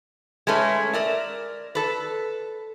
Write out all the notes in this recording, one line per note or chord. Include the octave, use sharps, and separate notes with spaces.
G#3 A3 C#4 B4
A#4 D5 E5
A4 B4